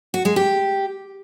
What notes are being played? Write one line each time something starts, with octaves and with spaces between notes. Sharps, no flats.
F#4
G#3
G4